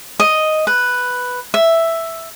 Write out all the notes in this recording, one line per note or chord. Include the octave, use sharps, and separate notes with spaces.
D#5
B4
E5